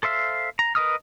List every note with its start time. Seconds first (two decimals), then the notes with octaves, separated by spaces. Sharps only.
0.03 A4 C5 E5 F5
0.59 A#5
0.75 A#4 B4 D#5 D#6 F6